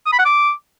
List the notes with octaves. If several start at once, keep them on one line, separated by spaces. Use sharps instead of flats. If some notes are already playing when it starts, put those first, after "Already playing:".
D#6
B5
F#5
D6